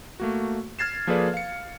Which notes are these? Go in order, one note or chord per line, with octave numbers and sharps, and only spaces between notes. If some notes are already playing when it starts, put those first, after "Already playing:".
A3 A#3 F#4
F6 G#6 A6 C7 E7
F3 A#3 G#4 A4 B4 D5
F5 C#7